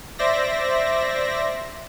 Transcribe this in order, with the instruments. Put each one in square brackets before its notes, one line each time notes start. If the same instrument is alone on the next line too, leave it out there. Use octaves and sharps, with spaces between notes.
[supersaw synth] C5 D5 E5 A#6